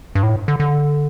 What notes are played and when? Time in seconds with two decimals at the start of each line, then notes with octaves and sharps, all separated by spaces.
0.15 G2
0.23 A2
0.48 D3
0.60 D3